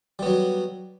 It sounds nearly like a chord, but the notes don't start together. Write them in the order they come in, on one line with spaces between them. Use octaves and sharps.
G3 B3 F#3